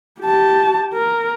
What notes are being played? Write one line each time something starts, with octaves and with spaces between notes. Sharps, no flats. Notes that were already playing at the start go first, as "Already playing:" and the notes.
G4 A5
A#4